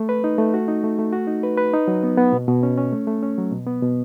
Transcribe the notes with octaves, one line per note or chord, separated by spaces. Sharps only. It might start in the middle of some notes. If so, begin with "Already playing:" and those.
Already playing: A3
B4
D#4
A3
F#4
D#4
A3
A3
F#4
D#4
B4
B4
D#4
F#3
B3
B3
B2
B2
C#4
C#4
A3
A3
C#4
F#3
B2
B3
B2